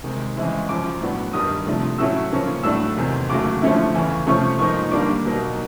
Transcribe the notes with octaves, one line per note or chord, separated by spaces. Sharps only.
C3 D#3 G#3
C#3 E3 G#3 C4 E4
F#2 C#3 F3 D6
A2 F#3 B3 D4
G2 D#3 G3 D#6
C3 F3 A3 D4
A2 F#3 A3 C#4 E4 E6
C#3 F3 A#3 C#4
A2 F#3 A3 D4 E6
E2 C3 D#3
D#2 C#3 F#3 A3 D6
D3 F3 A3 C#4 E4
E2 C#3 E3
C3 F3 A3 C#4 C#6
G#2 F3 A#3 D#4 C#6
D#2 D3 G3 A#3 D4 D6
B2 F#3 A#3 D#4